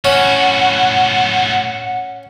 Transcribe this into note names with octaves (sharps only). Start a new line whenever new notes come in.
A2 C#4 F#4 F#5